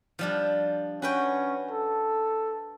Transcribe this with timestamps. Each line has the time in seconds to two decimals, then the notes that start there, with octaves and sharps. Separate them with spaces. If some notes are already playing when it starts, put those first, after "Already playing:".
0.19 F3 G3 D4
1.02 C#4 F#4 B4 G5
1.72 A4